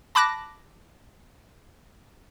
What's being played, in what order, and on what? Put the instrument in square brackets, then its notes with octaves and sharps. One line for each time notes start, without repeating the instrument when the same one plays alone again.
[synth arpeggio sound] A5 B5 D6 F#6 A#6